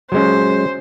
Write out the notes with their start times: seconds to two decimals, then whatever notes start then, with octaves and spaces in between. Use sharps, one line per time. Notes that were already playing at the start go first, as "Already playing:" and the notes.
0.12 F#3 G#3 C#4 C5